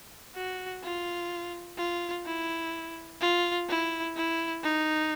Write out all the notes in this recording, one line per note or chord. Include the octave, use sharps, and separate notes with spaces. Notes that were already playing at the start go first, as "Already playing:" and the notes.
F#4
F4
F4
E4
F4
E4
E4
D#4